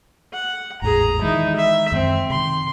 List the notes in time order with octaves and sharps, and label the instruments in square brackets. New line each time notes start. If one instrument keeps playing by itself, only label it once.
[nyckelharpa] F#5
[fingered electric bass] G#1 E2 A2 [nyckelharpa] G#4 A#5
[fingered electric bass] D#3 E3 G#3 [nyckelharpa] D#4 E4
[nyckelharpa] E5
[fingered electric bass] F#2 D#3 G#3 [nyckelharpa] C4
[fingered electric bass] C3 D#3 [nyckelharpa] C6